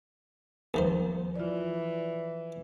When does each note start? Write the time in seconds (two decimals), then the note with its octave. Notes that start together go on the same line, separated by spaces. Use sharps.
0.74 D#2 D#3 F3 C5
1.36 E3 F4 D5